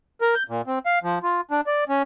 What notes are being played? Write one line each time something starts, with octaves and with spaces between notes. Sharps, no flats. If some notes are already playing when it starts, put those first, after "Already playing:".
A#4
G6
A#2
C4
F5
F3
F4
D4
D5
C#4